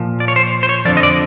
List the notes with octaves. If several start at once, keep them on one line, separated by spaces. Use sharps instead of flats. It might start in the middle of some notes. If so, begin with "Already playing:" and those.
Already playing: A#2 F3
D5
C#5
C5
C5
C#5
F2 D3 F3 D5
D#5
D5